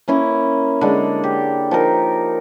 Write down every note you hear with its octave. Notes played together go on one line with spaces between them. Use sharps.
A#3 C#4 E4 A#5
D3 G#3
G4
F3 D#4 A#4